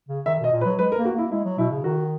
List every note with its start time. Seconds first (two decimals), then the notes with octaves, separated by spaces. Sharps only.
0.08 C#3
0.26 D#3 E5
0.40 B2 D#5
0.52 A#2
0.61 B4
0.65 F#3
0.79 G#3 B4
0.92 A#4
0.97 A#3
1.05 F#4
1.15 A#3 E4
1.31 G#3 E4
1.45 F#3
1.58 B2 E4
1.71 C#3
1.84 D#3 F#4